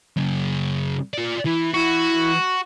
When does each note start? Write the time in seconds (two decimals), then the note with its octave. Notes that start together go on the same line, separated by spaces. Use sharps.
0.17 F#2 C#3
1.14 F4 D5
1.45 E3 E4
1.74 E4 F#4